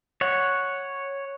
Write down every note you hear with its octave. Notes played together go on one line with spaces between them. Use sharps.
C#5 F#5